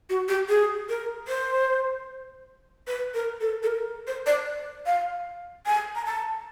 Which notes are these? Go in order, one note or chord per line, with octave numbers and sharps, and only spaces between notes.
F#4
G4
G#4
A#4
C5
B4
A#4
A4
A4
A#4
C5
D5
F5
G#5
A#5
A5